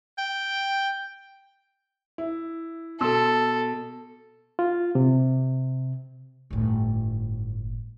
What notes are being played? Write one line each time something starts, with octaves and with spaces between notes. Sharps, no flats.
G5
E4
B2 A4 C6 E6
F4
C3
G1 A2